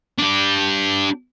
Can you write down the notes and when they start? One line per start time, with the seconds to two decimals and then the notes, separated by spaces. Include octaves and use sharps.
0.18 D4 G4